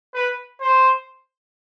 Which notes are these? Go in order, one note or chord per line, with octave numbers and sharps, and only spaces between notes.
B4
C5